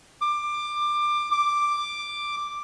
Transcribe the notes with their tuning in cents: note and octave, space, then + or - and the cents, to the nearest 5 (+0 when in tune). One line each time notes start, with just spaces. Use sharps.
D6 +20
D6 +5